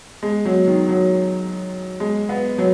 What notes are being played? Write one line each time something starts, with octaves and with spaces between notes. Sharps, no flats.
G#3
F#3
D#3
F#3
G#3
B3
F#3